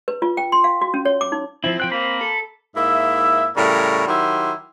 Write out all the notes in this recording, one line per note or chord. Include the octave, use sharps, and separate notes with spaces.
B4
F4
G5
C6
F5
F#4
C#4
C#5
D6
D#4
F3 C4 E4
F3 G5 F#6
A#3 A#5 B5
A4
G#2 A#3 E4 E5
A2 C#3 G3 A#4 C#5
D#3 F#3 E4 G4 C6